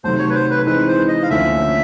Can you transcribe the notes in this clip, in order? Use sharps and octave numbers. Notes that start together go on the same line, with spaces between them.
C3 D#3 F#3 A3 C5
C#5
B4
C5
B4
E3 G#3 C4 D#4 B4
C5
D#5
F5
D2 D3 F3 A#3 C#4 E5